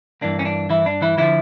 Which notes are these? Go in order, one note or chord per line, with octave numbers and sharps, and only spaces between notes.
G2 E3 A#3 D4
C#4
D4
E3 E4
D4
E3 E4
D3 E3 F3 E4